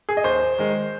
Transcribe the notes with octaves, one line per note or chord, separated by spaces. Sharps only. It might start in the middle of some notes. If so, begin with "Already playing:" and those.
G#4
D#5
D#2 C5
D#3 G#3